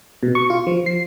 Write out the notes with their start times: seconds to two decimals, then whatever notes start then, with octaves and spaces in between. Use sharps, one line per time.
0.23 B2
0.35 C#6
0.50 F4
0.67 F3
0.86 C7